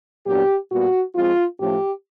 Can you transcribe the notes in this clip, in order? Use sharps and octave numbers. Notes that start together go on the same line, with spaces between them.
A#2 F#3 B3 D4 G4
A#2 G3 B3 F#4
F3 G#3 C4 F4
A2 F3 A3 C#4 G4